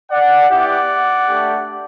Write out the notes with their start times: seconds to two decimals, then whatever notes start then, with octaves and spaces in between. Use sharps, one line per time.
0.11 D5 F#5
0.50 B3 E4 G4 D5 F#5
1.28 A3 D4 G4